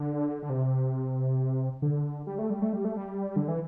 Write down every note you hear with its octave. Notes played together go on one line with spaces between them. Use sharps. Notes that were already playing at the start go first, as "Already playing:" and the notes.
Already playing: D3
D3
C3
D3
G3
A3
G3
A3
G3
A3
G3
D3
E3